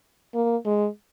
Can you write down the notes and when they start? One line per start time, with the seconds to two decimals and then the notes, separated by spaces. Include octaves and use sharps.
0.34 A#3
0.66 G#3